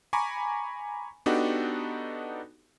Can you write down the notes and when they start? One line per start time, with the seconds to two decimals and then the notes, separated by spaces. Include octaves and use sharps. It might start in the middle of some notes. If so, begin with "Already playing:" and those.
0.13 G#5 A#5 B5 C#6 D6
1.26 B3 D4 D#4 F#4 G4 A4